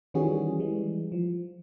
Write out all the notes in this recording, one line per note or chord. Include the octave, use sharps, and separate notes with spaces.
D#3 E3 G3 C#4 F#4 G#4
E3 G3 G#3
F3